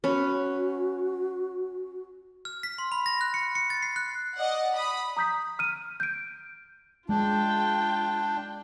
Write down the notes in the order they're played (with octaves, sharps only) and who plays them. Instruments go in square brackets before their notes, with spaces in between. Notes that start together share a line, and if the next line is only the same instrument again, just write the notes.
[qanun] C#4 B4 [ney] F#4
[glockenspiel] F6
B6
C6
B5
A#6
F#6
C#7
C#7
A6
C7
F#6
[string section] D5 D#5 F#5
B5 D#6
[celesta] A#5 D#6 G6 B6
F6 D#7
G6 D7
[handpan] G#3 [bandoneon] D4 [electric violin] F4 G5